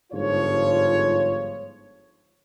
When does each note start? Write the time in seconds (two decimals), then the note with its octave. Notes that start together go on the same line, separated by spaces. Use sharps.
0.13 G1 G#2 F3 F4 C#5